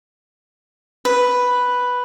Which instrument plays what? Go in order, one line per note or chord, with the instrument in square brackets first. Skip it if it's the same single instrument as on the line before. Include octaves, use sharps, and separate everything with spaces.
[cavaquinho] B4